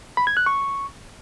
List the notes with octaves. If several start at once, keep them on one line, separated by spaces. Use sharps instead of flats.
B5
G#6
F#6
C#6